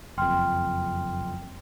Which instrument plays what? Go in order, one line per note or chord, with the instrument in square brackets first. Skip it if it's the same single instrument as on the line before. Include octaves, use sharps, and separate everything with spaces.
[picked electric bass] F#1 F2 [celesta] G5 C6 F6